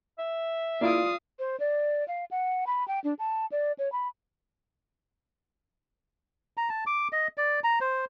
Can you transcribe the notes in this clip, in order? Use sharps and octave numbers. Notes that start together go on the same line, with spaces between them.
E5
A#3 E4 F4 D5 F5 D#6 D7
C5
D5
F5
F#5
B5
G5
D4
A5
D5
C#5
B5
A#5
A5
D6
D#5
D5
A#5
C5